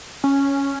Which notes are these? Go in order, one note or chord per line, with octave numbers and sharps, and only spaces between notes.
C#4